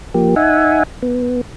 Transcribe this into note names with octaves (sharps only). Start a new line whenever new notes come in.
F3 A#3 G4
D#4 E5 F#5 G#5
B3